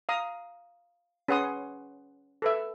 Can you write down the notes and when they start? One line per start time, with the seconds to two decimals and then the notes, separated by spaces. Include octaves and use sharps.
0.09 F5 A#5 D#6
1.28 C#4 G#4 B4 F#5 C6 D#6
2.42 A4 B4 E5